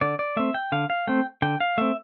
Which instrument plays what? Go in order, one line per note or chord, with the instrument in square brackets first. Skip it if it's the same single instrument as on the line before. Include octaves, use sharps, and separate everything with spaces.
[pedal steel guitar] D3 D5
D5
A3 C4 E5
G5
D3 F5
F5
A3 C4 G5
D3 G5
F5
A3 C4 E5